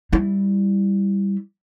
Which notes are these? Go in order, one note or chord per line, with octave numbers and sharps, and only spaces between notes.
G3 E4